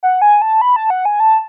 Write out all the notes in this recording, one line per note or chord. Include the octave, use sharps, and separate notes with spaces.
F#5
G#5
A5
B5
A5
F#5
G#5
A5